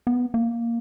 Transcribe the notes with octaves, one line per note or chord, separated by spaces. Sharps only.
B3
A#3